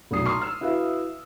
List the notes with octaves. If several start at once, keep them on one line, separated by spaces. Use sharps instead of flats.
F1 B1 A#2 F#3 D#6 C7
A#5 C6 C#6 D#6 F6 C7
E6 F6
E4 F#4 B4 E5 F5